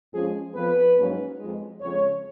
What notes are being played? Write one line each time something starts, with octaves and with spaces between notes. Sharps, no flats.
F2 F3 G#3 C#4 G#4
F2 F3 B3 B4
G#2 F#3 A#3 C#4
F2 F3 G#3
F2 C#3 G#3 C#5